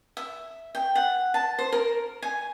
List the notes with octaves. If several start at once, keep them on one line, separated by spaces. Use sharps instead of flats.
E5
G5
F#5
A5
C5
A#4
G#5